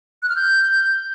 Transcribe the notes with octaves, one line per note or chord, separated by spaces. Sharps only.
F#6
F6
G6